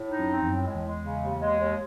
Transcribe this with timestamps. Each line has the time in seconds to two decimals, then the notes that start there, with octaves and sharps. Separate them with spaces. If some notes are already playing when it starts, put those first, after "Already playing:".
Already playing: A2
0.09 D#4
0.19 F#2
0.28 C4
0.42 E2
0.47 F#2 A2
0.66 G#3
0.75 E2
0.85 G#3
1.04 C#3
1.22 D#2
1.41 G#3
1.60 D#2